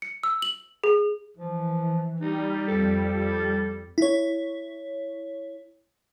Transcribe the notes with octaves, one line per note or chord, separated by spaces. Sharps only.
C#7
E6
F#7
G#4
E3 F3
G3 D#4
F2 A4
E4 C#5